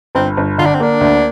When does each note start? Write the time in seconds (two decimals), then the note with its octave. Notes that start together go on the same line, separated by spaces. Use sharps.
0.15 G1 C4
0.37 G1
0.58 D3 F4
0.66 D4
0.75 C4
0.80 A#3 D4
1.01 D2